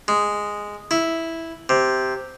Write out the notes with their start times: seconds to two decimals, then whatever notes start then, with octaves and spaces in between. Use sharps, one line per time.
0.08 G#3
0.91 E4
1.69 C3